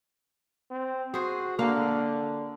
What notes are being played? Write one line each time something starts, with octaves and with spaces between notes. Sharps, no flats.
C4
F#4 G#4 C5
D3 A#3 F5